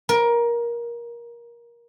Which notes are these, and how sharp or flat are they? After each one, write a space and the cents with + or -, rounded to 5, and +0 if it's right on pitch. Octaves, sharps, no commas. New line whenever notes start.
A#4 +20